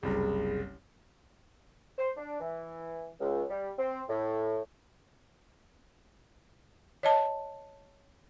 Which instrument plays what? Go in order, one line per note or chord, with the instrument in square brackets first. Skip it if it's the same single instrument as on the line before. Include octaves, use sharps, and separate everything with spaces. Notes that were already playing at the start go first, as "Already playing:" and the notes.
[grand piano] F#1 C2 [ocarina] G#4
[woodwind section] C5
D4
E3
C#2
G3
C4
A2
[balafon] C#5 D#5 A5